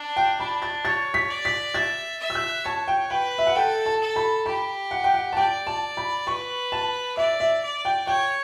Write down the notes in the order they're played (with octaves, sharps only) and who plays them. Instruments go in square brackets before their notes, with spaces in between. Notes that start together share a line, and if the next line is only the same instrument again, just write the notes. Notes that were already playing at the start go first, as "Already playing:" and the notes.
Already playing: [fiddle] D4
[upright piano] G5
[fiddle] D4 [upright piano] B5
[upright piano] A6
[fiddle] C#5 [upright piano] A6
[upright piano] B6
[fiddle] D5
[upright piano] B6
[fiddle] E5 [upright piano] A6
[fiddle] E5
[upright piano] E6
F#6
[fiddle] C#5 [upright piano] A5
[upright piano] G5
[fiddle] B4 [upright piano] G5
[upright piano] E5
F#5
[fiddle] A4 [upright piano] G5
[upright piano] A5
[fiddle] A4
[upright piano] B5
[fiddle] G4 [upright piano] B5
[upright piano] F#5
G5
F#5
A5
[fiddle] D5 [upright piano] G5
[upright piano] A5
B5
[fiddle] B4 [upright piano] C#6
[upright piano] A5
[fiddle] D5 [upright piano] E5
[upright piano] E5
[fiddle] D5
[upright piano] G5
[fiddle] C#5 [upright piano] G5